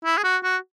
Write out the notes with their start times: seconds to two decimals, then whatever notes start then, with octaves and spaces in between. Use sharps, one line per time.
0.05 E4
0.18 G#4
0.24 F#4
0.43 F#4